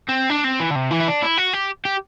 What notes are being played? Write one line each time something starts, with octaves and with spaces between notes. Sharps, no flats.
C4
D4
C4
E3
D3
C3
E3
E4
D4
E4
F#4
G4
G4